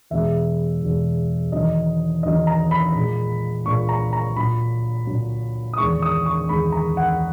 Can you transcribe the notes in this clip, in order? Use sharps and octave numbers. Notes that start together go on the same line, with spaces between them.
E2 B2 G#3 E5
E2 B2 G#3
E2 D#3 F#3 D#5
E2 D#3 F#3 D#5
A#5
B5
A#2 G#3
A#2 G#3 C#6
A#5
A#5
A#2 F#3 B5
A#2 F#3
D#6
E2 D#3 G#3 C#6
D#6
C#6
E2 D#3 G#3 B5
A#5
F#5